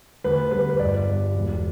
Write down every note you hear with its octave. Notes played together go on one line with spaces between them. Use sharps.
D2 B4
G3 B4
B4
G1 D5
G3
E1